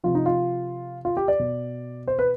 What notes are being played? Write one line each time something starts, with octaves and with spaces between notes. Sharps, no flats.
C3 F3 F4
D#4
F4
F4
G4
D5
B2
C5
B4